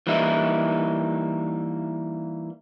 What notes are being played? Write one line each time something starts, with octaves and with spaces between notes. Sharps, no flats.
E3 G3 A#3 D#4 E4